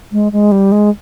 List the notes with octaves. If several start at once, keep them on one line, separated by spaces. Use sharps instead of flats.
G#3
G#3
G3
G#3